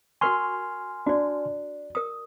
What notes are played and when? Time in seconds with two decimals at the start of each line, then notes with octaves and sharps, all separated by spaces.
0.21 F#4 A#4 G#5 C6 C#6 F6
1.06 D4 F#4 D5
1.95 A#4 D#6